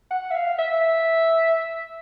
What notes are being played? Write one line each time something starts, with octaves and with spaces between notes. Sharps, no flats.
F#5
E5
F5
E5